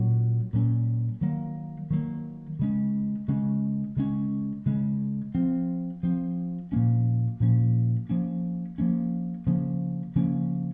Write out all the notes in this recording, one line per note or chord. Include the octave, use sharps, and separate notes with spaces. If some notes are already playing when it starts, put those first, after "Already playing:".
Already playing: A#2 F#3 C#4
A#2 F#3 C#4
D#3 F#3 A#3
D#3 F#3 A#3
C#3 G#3 C#4
C#3 G#3 C#4
C#3 G#3 C#4
C#3 G#3 C#4
F3 C4
F3 C4
A#2 F3 A#3 C#4
A#2 F3 A#3 C#4
F3 A#3 C#4
F3 A#3 C#4
C#3 F3 A#3 C#4
C#3 F3 A#3 C#4